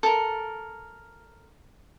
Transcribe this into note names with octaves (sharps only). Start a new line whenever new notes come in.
A4 A#4